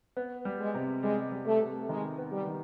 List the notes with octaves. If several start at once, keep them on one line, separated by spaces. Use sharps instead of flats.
B3
G3
G#3
C3
G3 G#3
G3
A3
C3
D#3 G#3
B3
G3
D#3